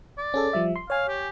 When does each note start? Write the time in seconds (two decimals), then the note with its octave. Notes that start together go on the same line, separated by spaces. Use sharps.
0.18 D5
0.34 C#4 G#4 A4
0.53 F3 G3 E5
0.76 C6
0.90 C#5 F5 G#5
1.08 G4